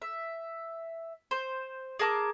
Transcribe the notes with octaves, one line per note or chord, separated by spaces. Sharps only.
E5
C5
G#4 A#4 A5 D6